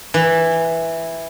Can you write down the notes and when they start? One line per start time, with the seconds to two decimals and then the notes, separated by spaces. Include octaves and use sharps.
0.14 E3